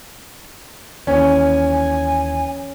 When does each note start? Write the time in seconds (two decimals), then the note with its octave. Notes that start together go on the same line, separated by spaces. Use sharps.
1.07 D#2 E3 C#4 G#5